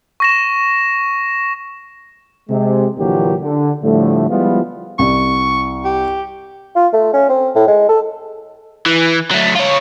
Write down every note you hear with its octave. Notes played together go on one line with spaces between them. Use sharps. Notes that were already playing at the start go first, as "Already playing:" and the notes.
C#6 A#6 E7
C3 G#3
A#1 A#2 D3 E3 F#3 G4
D3
A2 D3 F3 G3 A3
F3 G3 G#3 B3 E4 F4
C2 C#6
G4
F4
A3
C#4
C4
A2
G#3
A4
E3
F#3 A3
F4 C#5